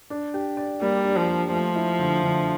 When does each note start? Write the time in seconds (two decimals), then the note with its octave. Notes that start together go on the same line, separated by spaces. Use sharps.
0.10 D4
0.34 G4
0.57 D5
0.81 G3 A#3
1.05 D4
1.16 F3
1.29 G4
1.52 F3 A3
1.76 E4
1.99 D3
2.23 D3